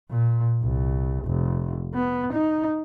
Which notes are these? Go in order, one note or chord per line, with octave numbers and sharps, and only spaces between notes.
A#2
C2
F1
B3
D#4